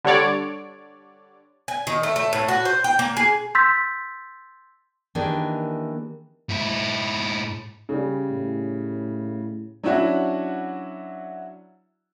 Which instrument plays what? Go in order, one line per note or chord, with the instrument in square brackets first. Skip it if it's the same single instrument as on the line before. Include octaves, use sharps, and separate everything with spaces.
[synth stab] D3 G3 C#5 D5
[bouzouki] G#5
D#3
A3
A3
A2
F#4
C5
G5
A#3
G#4
[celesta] C6 E6 G6 A6 B6
[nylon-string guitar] D#3 E3 A#3 D4 G4 G#4
[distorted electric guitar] G#2 E4
[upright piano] C#3 G3
[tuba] A2
[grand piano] F#3 C#4 D4 E4 F#4 F#5